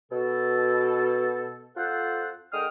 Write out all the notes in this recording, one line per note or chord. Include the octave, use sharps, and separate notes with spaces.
B2 A4
F2 F4 A4 C5 F#5
D3 G#3 A#4 G5 D#6 F6